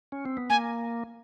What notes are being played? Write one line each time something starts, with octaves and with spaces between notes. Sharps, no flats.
C#4
C4
B3
A#3 G#5